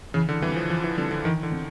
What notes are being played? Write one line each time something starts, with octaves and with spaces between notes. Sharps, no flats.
C#3 E3
D3
E3 G3 C4
F3
E3 F3
E3
D3 G3 C4
D3
D#3 E3
D3
C4